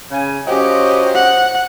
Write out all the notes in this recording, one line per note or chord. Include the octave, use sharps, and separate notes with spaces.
C#3 G#5
F#3 C#4 F4 G4 C5 D#5
F#5